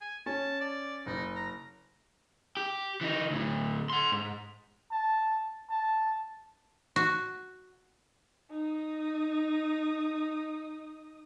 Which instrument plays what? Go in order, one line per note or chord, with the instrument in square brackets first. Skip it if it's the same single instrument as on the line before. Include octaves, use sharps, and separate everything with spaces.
[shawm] G#5
[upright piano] C#4 [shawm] A5
[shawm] D5
[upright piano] F#1 A#6 [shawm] D#4
[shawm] A#5
[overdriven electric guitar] G4
E3 D#4
D2 A2
F#5 C6
G#2
[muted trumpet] A5
A5
[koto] F#4
[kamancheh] D#4 D#6